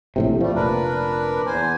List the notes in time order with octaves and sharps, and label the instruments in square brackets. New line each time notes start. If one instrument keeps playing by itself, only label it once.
[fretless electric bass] A#1 A2 C3
[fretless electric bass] F3 [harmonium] G3 A3
[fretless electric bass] F1 A#2 [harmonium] D4 A#4 B4
[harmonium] E2 C5 G#5